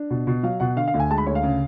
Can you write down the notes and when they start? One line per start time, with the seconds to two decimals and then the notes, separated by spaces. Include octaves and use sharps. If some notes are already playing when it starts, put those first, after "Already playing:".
Already playing: D4
0.11 B2
0.27 B2
0.43 F#3 F5
0.60 B2 F#5
0.76 D3 F5
0.88 F5
0.94 D2
1.00 G#5
1.10 G#3 A5
1.18 B5
1.26 D2 C#5
1.35 F5
1.43 C#3